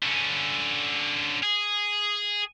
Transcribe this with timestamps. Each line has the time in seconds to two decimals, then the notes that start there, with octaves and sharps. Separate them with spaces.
0.03 D3 C#4
1.43 G#4